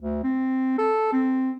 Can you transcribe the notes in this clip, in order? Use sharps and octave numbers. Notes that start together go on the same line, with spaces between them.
D2
C4
A4
C4